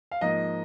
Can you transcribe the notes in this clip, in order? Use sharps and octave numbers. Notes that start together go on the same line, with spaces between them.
F5
G#2 F3 A#3 D#5